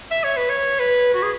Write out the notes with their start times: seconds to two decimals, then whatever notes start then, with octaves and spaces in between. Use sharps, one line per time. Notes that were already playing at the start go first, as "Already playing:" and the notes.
0.11 E5
0.24 C#5
0.37 B4
0.49 C#5
0.79 B4
1.14 F#4
1.22 G#4